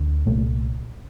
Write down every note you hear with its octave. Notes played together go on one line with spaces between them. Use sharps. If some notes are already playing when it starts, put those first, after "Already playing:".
Already playing: D2 D3
C2 A#2 A3